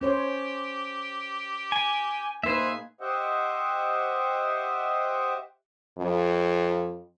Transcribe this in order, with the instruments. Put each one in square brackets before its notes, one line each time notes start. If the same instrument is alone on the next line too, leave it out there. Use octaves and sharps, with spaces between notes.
[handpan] C#4 C5 C#5 [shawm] G4
[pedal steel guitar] G#5
[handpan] A#3 D#4 B4 [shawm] G#4 [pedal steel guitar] C5 E5
[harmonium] G4 C5 D#5 E5 F#5 G5
[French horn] F2